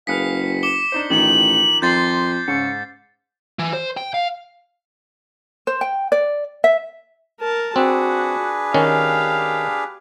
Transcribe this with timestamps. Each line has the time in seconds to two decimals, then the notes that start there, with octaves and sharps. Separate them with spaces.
0.07 F#1 G#4 B4 F5 B6 C#7
0.63 D6 C#7 E7 G7
0.92 D4 D#4 C5
1.10 A1 D#3 F3 D#4 F#7
1.82 F2 C6 G6 A6 C7
2.48 G#2 C#3 C#7
3.59 E3
3.73 C5
3.97 G5
4.14 F5
5.67 C5
5.81 G5
6.12 D5
6.64 E5
7.40 A#4 A5
7.76 C4 D4 F#4 G#4 B4
8.74 D#3 C#4 G4 F5